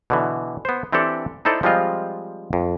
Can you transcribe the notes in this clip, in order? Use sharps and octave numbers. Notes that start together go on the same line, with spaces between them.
B2 D3 E3
B3 C5
E3 C4 D4 G4 A4 D5
D#4 E4 A4 C5 D5
F3 G3 G#3 C4 F4 D#5
F2